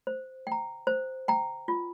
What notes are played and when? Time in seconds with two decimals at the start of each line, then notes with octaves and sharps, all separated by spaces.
0.07 C5
0.47 G5 A#5
0.87 C5
1.28 G5 A#5
1.68 F4